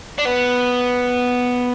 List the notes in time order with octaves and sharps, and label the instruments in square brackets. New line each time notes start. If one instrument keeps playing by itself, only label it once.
[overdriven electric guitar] D4
B3